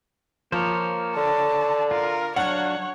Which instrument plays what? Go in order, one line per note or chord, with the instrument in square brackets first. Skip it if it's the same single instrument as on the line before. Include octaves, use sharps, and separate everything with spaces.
[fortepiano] F3 [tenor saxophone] A#3 [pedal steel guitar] C5 C#5
[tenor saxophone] D3 [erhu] A5
[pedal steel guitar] F4 [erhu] A#4
[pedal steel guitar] F#3 D4 F5 [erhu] C#5 [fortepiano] F#5